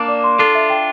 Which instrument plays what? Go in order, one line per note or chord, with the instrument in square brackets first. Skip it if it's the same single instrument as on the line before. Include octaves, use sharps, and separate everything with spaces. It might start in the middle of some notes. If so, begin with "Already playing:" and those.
Already playing: [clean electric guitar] A#3 D4
[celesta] D5
C6
[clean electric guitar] D4 F4 [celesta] A4
[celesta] E5
G5